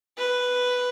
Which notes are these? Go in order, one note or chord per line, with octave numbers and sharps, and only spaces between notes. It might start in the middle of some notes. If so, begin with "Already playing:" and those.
B4